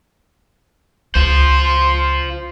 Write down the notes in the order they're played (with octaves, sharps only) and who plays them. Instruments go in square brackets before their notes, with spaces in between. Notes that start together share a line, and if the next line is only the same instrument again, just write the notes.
[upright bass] C#2 [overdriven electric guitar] F4 C5